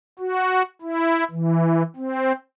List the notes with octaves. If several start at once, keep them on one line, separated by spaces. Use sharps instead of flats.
F#4
E4
E3
C4